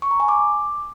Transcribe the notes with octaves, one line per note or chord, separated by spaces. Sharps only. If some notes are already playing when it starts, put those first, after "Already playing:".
C#6
A#5
G#5
D6